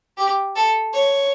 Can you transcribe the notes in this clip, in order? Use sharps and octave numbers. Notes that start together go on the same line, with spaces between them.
G4
A4
C#5